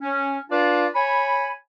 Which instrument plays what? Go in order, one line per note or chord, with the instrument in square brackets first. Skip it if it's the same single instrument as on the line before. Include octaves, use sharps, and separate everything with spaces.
[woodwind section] C#4
D4 F4 B4 D5 F5
C#5 G#5 B5